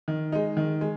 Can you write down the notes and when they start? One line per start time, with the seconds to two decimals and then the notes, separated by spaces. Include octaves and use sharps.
0.08 D#3
0.32 G#3 D#4
0.57 D#3
0.81 G#3